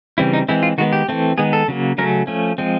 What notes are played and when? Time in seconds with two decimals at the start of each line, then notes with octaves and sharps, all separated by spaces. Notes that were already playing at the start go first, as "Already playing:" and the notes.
0.18 C#3 E3 G3 C4 E4
0.33 D#4
0.48 E3 G#3 C4 E4
0.63 F4
0.78 D#3 G#3 B3 F#4
0.93 G4
1.09 E3 A3 C4
1.38 D#3 G#3 B3 G#4
1.53 A4
1.68 C#3 F#3 A#3
1.98 C#3 F#3 A3 C#4 A#4
2.27 F3 A3 C#4
2.58 F3 G#3 C4